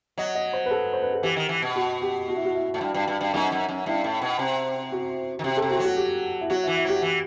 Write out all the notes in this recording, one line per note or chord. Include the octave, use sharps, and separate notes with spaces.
F#3 D#5
D#5
C5
B4
A4
C5
B4
A4
E3 G4
D#3
E3
B2
F#4
G4
F#4
E4
F#4
E4
A2
G2
G2
G2
G2
F#2 D#4
F#2
F#2
G2 E4
A2
B2
C3
F#4
D#3
C3 G4
A4
C3
F#4
F#3
F#4
G4
E4
F#3 F#4
E3 E4
E4
F#3 G4
E3